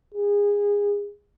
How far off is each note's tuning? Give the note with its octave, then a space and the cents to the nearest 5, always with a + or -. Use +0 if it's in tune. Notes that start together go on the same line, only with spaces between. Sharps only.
G#4 -25